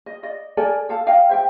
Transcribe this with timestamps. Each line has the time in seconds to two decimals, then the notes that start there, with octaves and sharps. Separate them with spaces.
0.06 D#5
0.23 D5 D#5
0.57 A4 A#4 D5 G#5
0.89 A4 F5 A5
1.07 D#5 F5 G5
1.29 C5 E5 G5